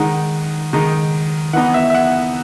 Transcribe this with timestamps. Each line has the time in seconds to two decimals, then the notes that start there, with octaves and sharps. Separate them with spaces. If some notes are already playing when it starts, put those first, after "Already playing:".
Already playing: D#3 G#3 D#4 F#5
0.73 D#3 G#3 D#4
1.53 E3 B3 D#4 F#5
1.74 E5
1.90 E5
1.94 F#5